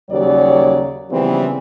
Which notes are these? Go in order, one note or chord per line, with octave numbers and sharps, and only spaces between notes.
D#2 C#3 F#3 G3 C#5 D5
C#3 E3 F3 G3 B3 C4